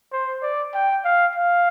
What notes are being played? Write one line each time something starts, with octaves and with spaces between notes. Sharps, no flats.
C5
D5
G5
F5
F5